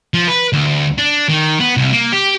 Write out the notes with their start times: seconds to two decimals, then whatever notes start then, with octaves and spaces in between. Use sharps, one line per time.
0.14 F3
0.28 B4
0.53 D2
0.98 D4
1.29 D#3
1.60 B3
1.77 C2
1.92 A#3
2.12 G4